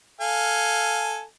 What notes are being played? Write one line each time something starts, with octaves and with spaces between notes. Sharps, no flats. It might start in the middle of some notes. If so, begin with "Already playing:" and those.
A4 F5 G#5